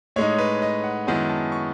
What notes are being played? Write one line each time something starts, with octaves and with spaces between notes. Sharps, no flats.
A2 G#3 D#4 C#5
B4
D#5
F#5
F#2 D#3 G#3 B3 E4 G#5
A5
C#6